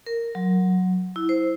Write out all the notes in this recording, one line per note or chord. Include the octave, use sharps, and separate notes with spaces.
A#4
F#3
E4
C5